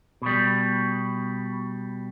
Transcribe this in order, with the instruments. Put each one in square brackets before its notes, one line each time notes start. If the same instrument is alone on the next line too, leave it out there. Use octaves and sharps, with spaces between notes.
[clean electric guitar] B2 G3